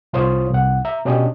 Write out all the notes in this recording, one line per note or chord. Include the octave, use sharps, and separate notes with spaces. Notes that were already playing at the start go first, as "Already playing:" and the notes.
C2 F4 C5 C#5 D#6
C2 F#5
E5 A#5
B2 C#4 D4 G4 D#5